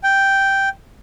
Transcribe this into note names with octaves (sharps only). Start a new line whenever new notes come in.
G5